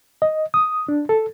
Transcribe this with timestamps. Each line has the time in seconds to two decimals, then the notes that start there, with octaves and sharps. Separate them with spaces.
0.22 D#5
0.54 D#6
0.89 D4
1.09 A4